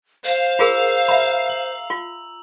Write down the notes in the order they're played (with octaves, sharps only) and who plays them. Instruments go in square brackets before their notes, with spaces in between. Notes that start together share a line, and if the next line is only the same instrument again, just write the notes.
[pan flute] C5 [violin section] F5
[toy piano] F4 G#4 A#4 [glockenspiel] A#5 E6 F7
[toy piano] E5 B5 [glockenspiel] A#5
[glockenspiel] F#7
[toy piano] F4